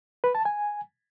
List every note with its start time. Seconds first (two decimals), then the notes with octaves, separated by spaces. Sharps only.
0.24 B4
0.35 A5
0.45 G#5